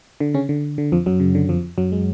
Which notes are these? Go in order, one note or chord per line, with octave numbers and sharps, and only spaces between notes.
D3
C#3 C#4
D3
D3
F2 F3
F#2 F#3
C#3
D3
F2 F3
F#2 F#3
G#3